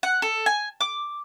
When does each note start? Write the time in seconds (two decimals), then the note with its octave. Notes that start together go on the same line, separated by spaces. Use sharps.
0.03 F#5
0.22 A4
0.46 G#5
0.81 D6